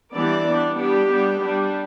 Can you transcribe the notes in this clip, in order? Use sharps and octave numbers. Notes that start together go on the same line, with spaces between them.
E3 G3 B3 D4 D5
G3 B3 D4
G3 B3 D4 G4
G3 B3 D4
G3 D4